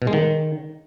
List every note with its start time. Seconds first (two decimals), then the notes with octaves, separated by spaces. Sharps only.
0.02 B2
0.07 G#3
0.13 D#3